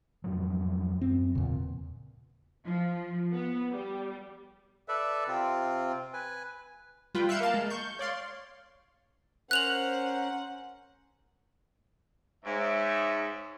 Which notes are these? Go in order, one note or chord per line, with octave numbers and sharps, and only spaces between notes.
F2 G#2 F#3
F#2 C4
E2 A#2 C#3
F3
B3
G3
A4 B4 D5 E5
C3 C4 F4
B4 G#5
G3 F4 B4 G5
E5 F5 F#6 G6 C#7 E7
A#3 A#4 F5 A5
G#3
C#6 G6
C#5 D5 F5 C6
C#4 A#4 C5 F#5 F#6 F7 F#7
G#2 C#5 E5